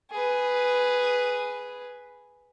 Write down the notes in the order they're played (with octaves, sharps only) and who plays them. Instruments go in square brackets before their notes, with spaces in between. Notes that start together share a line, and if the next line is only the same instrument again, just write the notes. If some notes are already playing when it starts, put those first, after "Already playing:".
[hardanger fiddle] G#4 B4